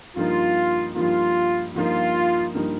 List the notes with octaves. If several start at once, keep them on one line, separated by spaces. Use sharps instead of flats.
G2 F3 A#3 D#4 F4
G2 F3 A#3 D#4 F4
G2 F3 A#3 D#4 F4
G2 F3 A#3 D#4